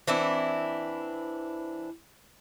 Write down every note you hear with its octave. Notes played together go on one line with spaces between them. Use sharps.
E3 C4 D4 E4